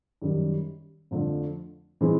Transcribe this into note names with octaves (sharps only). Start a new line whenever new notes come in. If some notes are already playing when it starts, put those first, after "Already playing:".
F#2 D#3 G3
F2 D3 F3 A3
E3 G#3 C4